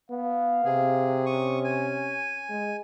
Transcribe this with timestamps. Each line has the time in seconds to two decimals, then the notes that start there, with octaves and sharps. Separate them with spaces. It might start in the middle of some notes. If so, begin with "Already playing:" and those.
0.11 B3 F5
0.65 C3 G#4
1.26 C#4 C#6 D#6
1.64 G#5
2.49 G#3